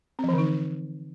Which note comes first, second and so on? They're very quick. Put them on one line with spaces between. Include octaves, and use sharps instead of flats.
C4 F3 E3 D3 D#4